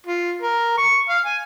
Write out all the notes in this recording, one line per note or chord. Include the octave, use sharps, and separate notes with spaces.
F4
A#4
C#6
F5
G#5